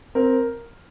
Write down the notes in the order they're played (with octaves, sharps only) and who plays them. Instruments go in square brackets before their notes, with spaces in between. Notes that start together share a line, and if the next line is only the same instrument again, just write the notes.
[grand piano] C4 A#4